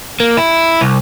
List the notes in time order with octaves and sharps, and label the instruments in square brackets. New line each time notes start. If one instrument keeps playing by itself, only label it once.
[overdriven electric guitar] A#3
E4
C2